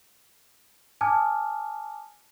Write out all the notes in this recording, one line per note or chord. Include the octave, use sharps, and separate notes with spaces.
G#5 A5 D6 D#6 F6 G#6